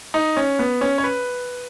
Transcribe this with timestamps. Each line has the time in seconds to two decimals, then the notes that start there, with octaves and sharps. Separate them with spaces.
0.14 D#4
0.37 C#4
0.59 B3
0.81 C#4
0.98 C#5
1.04 B4